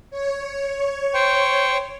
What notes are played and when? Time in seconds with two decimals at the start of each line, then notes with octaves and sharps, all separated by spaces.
0.11 C#5
1.14 C5 G5 C#6